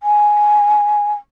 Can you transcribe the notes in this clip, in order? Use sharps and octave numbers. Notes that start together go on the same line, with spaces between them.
G#5